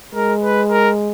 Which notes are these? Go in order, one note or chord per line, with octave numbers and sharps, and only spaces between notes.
G#3 A#4
B4
A#4